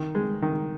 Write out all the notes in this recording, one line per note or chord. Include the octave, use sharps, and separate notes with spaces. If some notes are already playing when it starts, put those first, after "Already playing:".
Already playing: D#3
G#3
D#3